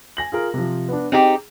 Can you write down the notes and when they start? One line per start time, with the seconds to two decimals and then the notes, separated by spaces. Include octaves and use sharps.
0.17 G#5 A#6 F#7
0.32 F4 G#4 A#4
0.54 C3 F3
0.89 B3 D4
1.12 C4 D#4 G4 G#4